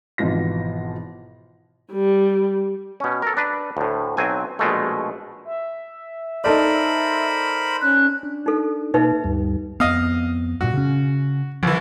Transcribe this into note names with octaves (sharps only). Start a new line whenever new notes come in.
G#1 B2 E3 F3 F4 A#6
G3
B2 C#4
A4 A#4
D4 B4
D2 A2
B1 F#3 C4 G#5
A#1 B2 G#3 A3
E5
D#4 A4 A#4 C5 D5 B5
C#4 F#6
D4
D#4 A4
B2 A#3 D#4 B4 E5
D2 G2 G3
F2 B3 D#5 F5
G2 A#2 F#4
C#3 C#4
C2 D3 E3 F3